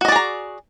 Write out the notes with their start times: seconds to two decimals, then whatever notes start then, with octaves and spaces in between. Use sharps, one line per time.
0.01 F#4
0.05 D#5
0.08 D5
0.12 G#4
0.16 A#5